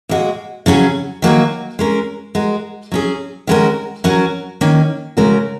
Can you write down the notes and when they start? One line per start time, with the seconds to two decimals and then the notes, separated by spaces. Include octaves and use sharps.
0.09 A#2 G#3 F#4
0.66 C#3 F#3 C#4 G#4
1.22 D#3 F#3 A#3 F#4 A#4
1.79 G#3 C#4 A#4
2.35 G#3 F#4 A#4
2.92 F#3 C#4 G#4
3.47 D#3 G#3 C#4 F#4 A#4
4.04 F#3 C#4 F#4 A#4
4.61 D#3 A#3 C#4
5.17 C#3 G#3 C#4 F#4 A#4